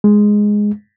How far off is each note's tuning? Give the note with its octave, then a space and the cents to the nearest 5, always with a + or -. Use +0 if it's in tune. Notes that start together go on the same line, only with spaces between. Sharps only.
G#3 +0